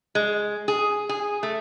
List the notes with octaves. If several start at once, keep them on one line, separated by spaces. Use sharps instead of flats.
G#3
G#4
G#4
A3